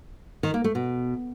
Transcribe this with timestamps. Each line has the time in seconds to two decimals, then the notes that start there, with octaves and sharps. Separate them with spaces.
0.43 D#3
0.54 A#3
0.64 A3
0.75 B2